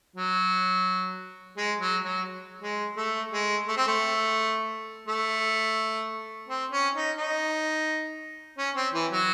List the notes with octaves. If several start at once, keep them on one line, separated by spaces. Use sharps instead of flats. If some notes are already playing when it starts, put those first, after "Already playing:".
F#3
G#3
F#3
F#3
G#3
A3
G#3
A3
C4
A3
A3
C4
C#4
D#4
D#4
C#4
C4
E3
F#3